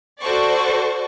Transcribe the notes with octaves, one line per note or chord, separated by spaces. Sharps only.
F#4 A4 C5 D5 C#6